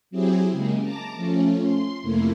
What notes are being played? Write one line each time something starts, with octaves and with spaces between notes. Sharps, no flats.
F#3 C4 E4 G4 G#4
C#3 G#3 A#3
A5 A#5 D6
F3 A3 C#4
C6
F2 C3 A3 A#3 E4